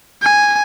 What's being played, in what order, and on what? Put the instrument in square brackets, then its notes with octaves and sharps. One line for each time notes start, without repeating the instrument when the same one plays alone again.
[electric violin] G#5